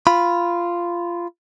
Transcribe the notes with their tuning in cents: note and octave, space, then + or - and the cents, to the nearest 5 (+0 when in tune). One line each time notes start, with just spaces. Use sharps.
F4 -10 B5 +0